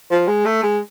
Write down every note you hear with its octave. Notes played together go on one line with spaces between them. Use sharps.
F3
G#3
A3
G#3